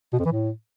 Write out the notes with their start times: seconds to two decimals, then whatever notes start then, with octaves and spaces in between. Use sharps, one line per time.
0.13 B2
0.19 F2
0.26 E3
0.32 A2